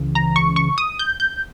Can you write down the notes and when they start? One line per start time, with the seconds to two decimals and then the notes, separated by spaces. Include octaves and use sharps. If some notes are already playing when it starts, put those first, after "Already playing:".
Already playing: C#2 C#3 E3
0.15 A#5
0.36 C#6
0.56 C#6
0.78 D#6
0.99 G6
1.20 G6